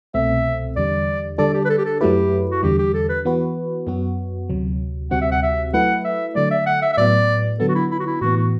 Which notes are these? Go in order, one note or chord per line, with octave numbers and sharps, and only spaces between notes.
C2 B2 A3 C4 E5
E2 D3 G3 D5
D3 G3 D4 A4 D5
G4
B4
A4
G4
A4
F#2 F#3 A3 E4 G4 B4
F#4
E2 D3 G3 G4
G4
A4
B4
E3 B3 F#4 B4
F#2 F#3 B3 F#4
D2 C3 F#3
D2 C3 G3 C4 F#4 F#5
E5
F#5
E5
F#3 A3 E4 B4 F#5
E5
D3 F#3 A3 D5
E5
F#5
E5
E5
A2 F#3 B3 D5
D3 F#3 B3 A4
F#4
E4
E4
F#4
E4
A2 E3 B3 F#4
F#4